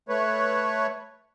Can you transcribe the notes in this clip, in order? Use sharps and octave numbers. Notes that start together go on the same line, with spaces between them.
A3 B4 C#5